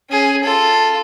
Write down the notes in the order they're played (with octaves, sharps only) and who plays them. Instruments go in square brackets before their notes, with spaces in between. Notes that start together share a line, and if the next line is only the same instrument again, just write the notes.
[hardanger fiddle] C#4 G#4
F4 A4